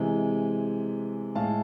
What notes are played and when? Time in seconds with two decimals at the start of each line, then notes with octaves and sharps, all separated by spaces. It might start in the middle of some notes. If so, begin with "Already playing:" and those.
Already playing: C3 E3 G#3
1.35 A2 G#3 F5 A5